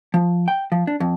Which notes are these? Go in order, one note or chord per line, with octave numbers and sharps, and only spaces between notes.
F3
G5
F3
D4
F2